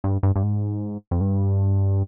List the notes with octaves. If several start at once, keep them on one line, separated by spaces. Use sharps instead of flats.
G2
G2
G2
G#2
F2
G2